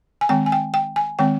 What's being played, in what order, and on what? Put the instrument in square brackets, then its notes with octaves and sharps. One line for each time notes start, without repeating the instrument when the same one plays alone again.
[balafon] G#5
D#3 G#3 C4 G5
G#5
G5
G5
G#5
D#3 G#3 C4 G5